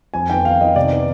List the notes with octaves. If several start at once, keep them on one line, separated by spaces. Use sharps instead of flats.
F2 G#5
D#3 B3 G5
F2 F5
D#3 B3 D#5
C3 D5
D#3 B3